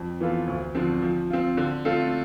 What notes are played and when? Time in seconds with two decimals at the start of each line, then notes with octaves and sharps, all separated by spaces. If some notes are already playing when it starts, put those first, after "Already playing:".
Already playing: F2
0.20 E3 B3 F4 A4
0.47 D2
0.75 D3 F3 C4
1.02 F3
1.30 C4 F4
1.57 D3
1.85 A3 C4 F4 A4